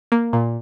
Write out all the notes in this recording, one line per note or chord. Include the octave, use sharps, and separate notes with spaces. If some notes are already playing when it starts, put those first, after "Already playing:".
A#3
A#2